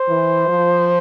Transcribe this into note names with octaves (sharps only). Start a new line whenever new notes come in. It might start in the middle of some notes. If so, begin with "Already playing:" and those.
Already playing: C5
E3
F3